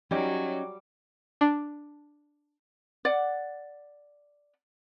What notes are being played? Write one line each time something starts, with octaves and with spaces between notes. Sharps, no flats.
F#3 G3 C#4 D#4 D6
D4
D5 F#5